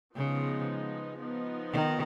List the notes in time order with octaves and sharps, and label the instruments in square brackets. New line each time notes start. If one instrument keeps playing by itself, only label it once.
[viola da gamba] C#3 [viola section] F3 G#3 B3 D#4
[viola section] F3 B3 D#4
[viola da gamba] D#3